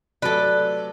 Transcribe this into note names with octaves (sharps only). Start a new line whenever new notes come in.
C3 F#3 A3 A4 B4 D5